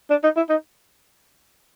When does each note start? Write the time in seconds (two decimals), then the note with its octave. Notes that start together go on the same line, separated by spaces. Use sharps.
0.10 D4
0.24 D#4
0.37 E4
0.50 D#4